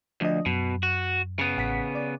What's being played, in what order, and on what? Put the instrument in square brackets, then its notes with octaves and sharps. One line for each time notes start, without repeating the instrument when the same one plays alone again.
[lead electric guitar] D2 [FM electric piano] F3 D4 D#5
[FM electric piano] F#2 [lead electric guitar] B2
[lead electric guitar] F#4
C#3 B3
[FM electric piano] A1 F#5 B6
D5